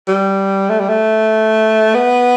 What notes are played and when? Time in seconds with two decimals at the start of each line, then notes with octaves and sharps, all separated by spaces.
0.08 G3
0.70 A3
0.80 G3
0.89 A3
1.94 B3